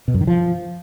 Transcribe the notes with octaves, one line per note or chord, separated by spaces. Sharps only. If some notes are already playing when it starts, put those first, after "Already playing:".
B2
F#2
D#3
F3